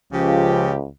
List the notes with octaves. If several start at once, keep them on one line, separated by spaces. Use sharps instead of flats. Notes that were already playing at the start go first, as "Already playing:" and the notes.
C#2 C#3 F3 G4